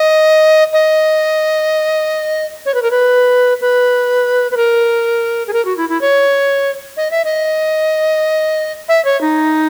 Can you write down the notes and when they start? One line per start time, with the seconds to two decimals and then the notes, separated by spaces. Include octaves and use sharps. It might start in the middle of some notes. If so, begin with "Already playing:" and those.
Already playing: D#5
0.73 D#5
2.66 C#5
2.74 B4
2.82 A#4
2.91 B4
3.61 B4
4.51 B4
4.57 A#4
5.47 G#4
5.53 A#4
5.65 F#4
5.77 E4
5.89 E4
6.01 C#5
6.97 D#5
7.11 E5
7.25 D#5
8.89 E5
9.05 C#5
9.21 D#4